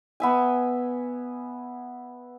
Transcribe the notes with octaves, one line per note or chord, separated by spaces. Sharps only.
B3 E5 G#5